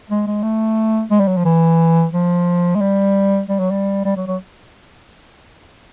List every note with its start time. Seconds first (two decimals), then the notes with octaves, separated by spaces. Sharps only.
0.10 G#3
0.27 G#3
0.43 A3
1.11 G#3
1.20 G3
1.28 F#3
1.37 F3
1.45 E3
2.13 F3
2.75 G#3
2.81 G3
3.49 G3
3.59 F#3
3.71 G3
4.05 G3
4.16 F#3
4.27 F#3